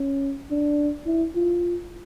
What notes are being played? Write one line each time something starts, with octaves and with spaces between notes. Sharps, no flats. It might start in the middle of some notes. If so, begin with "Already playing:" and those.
Already playing: C#4
D4
E4
F4